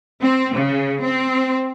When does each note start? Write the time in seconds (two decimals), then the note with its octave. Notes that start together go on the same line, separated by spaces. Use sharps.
0.21 C4
0.55 C#3
1.04 C4